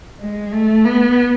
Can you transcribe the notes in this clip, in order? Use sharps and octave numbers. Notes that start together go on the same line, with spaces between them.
G#3
A3
B3